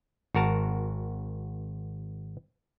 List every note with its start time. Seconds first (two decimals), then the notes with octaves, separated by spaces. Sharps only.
0.35 G#1 F#4 A#4 A5